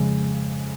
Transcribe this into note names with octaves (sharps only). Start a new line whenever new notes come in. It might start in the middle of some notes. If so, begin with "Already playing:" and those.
Already playing: F2 C#3 G#3